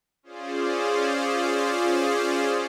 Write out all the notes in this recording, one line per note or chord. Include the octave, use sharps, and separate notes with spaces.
C#4 F4 G#4 C5 D5